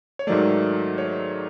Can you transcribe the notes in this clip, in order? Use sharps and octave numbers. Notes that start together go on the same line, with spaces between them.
C#5
G#2 D#3 F#3 A3 D5
C#5